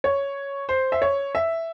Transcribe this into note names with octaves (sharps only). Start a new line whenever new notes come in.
C#5
C5
E5
C#5
E5